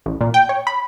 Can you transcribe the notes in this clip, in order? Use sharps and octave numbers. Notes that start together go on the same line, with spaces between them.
A1
A#2
G5
C#5
B5